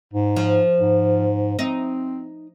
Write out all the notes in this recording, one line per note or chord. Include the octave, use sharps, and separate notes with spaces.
G#2
F3
G#2
C4 D#4